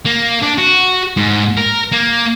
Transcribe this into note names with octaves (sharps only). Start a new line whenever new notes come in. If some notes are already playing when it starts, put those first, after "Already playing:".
A#3
D4
F#4
G#2
A#4
A#3